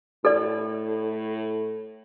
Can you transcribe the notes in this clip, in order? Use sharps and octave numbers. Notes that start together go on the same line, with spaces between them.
A2 A4 D5